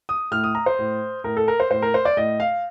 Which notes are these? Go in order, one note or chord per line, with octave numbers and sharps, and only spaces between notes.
D#6
A2 F6
D#6
A#5
C5
A2
A2 A#4
A4
A#4
C5
A2 C5
A#4
C5
D5
A2 D#5
F5